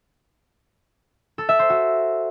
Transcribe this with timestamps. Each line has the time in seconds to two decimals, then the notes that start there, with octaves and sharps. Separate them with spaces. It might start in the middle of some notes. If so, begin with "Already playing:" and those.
1.38 A4
1.49 E5
1.59 C5
1.70 F#4